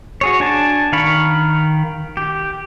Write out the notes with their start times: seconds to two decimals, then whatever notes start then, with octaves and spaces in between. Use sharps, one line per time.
0.21 F#4 G#4 C#5
0.40 D4 G#5 A5
0.93 D#3 F5 B5 C#6
2.17 G4